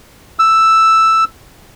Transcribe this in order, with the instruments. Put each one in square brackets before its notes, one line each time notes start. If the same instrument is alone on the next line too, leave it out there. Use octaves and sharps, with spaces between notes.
[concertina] E6